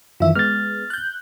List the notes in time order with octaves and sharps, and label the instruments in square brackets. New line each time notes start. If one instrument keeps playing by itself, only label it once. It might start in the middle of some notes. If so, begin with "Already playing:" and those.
[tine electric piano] F#2 D#3 E3 [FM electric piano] F4 E5
[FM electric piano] G#3 B3 [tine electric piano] F6 A6
[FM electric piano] F#6 G6